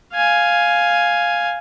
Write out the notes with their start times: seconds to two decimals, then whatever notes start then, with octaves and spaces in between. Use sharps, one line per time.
0.14 F5 G#5